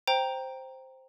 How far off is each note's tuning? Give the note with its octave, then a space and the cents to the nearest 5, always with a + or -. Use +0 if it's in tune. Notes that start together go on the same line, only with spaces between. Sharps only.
C5 +0 G5 +0 A#5 +0